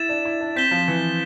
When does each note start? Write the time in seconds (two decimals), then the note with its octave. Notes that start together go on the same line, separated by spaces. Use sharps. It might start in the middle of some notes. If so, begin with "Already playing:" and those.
Already playing: E4 A6 E7
0.09 D4
0.25 E4
0.41 D4
0.56 C4 G6 B6 E7 G7
0.71 F3
0.88 E3